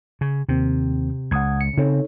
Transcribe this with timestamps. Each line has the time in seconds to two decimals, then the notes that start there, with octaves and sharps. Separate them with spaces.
0.21 C#3
0.49 D#2 C3 D#3 C4
1.31 C#2 F#5 D#6 G#6
1.61 C#7
1.77 C#3 C4 D#4 A4 C#5